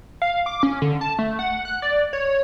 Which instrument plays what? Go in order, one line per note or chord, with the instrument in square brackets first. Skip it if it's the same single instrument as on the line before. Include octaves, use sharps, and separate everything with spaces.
[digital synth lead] F5
D6
C#4
D3
A5
A3
F#5
F#6
D5
C#5